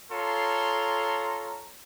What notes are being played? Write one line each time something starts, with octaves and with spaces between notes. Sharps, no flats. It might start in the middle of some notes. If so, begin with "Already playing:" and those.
F4 A4 C#5 A#5 C6